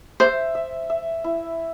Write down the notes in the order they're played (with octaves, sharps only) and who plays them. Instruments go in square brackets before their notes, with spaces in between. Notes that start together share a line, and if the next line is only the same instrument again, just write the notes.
[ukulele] C5 [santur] E5
[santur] E5
E5
E4